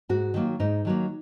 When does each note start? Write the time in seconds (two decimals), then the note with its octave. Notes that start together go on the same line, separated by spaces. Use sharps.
0.09 G#2 F#4
0.34 D#3 F#3 A#3
0.60 G#2 D#4
0.85 D#3 F#3 A#3